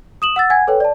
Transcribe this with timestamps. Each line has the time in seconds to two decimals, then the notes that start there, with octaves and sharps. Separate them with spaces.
0.22 D#6 E7 F#7
0.36 F#5 E6 A6
0.50 F#5 G#5 G#6
0.67 A4 B4 C#5 G5
0.80 D5 A5